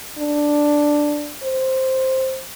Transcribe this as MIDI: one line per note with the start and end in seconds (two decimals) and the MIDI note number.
0.18 1.33 62
1.43 2.41 72